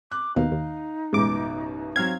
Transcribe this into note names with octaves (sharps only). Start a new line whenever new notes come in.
D6 F#6
D#2 B2 D#4 F5
D#2
A1 F#2 B2 G#3 D6
F#3 C4 F5 G#6